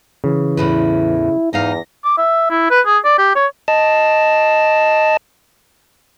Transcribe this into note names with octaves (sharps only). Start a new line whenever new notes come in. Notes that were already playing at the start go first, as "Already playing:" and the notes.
C#3 E3
E2 A2 E4 B4
E2 G#2 D#4 F5 A#6
D6
E5
E4
B4
G#4
D5
G4
C#5
D#5 A5